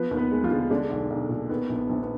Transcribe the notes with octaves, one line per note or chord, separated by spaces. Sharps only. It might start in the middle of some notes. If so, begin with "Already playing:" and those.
Already playing: F3 B3 B4
D#2
B3 B4
G#3
F3 F4
D3
D3 G#3 D4
B1
B1
A#2
D#3 B3
A#1
B3
A#1
B3